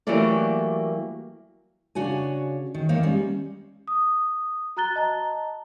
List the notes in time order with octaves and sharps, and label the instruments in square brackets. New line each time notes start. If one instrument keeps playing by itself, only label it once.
[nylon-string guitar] E3 F#3 G3 A3 A#3 D5
[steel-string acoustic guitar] C#3 D4 F#4 C#5 G#5
D#3
D#3 A#3 C5 C#5
G3 G#3 C#4
[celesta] D#6
F#4 A#5 F#6 A6 G7
D#5 A5 A#5